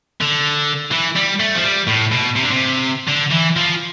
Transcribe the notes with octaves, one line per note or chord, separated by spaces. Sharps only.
D3
E3
G3
A3
F3
G3
A2
B2
C3
D3
C3
D3
E3
F3